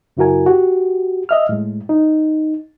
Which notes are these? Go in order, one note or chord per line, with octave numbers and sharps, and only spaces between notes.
F#2 C#3 E4 F#4 A#4 G#5
F#4 G4
D#5 E5 F6
A2 G#3
D#4